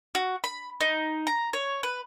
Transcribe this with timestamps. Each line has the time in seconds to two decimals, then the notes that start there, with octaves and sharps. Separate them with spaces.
0.15 F#4
0.44 B5
0.81 D#4
1.27 A#5
1.53 C#5
1.83 B4